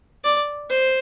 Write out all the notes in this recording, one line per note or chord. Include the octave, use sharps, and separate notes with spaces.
D5
C5